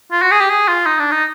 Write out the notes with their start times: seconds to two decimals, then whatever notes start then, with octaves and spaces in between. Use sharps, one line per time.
0.12 F4
0.22 F#4
0.31 G#4
0.40 G4
0.50 G#4
0.68 F4
0.86 D#4
0.99 D4
1.11 D#4